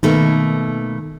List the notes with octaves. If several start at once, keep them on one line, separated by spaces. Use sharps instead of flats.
B2 D#3 A3 A#3